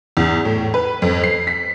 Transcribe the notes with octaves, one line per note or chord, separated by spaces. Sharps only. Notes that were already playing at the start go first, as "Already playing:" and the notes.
E2
A2
B4
F2
C7
B6